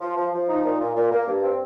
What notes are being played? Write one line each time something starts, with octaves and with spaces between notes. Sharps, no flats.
F3
F3
F3
D#4
A#2
A#2
A#2
A#3
G2
C4